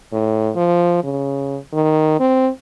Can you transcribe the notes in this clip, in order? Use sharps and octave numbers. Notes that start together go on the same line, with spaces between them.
A2
F3
C#3
D#3
C4